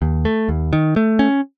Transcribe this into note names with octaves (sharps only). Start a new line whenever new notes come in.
D#2
A3
D#2
D#3
A3
C#4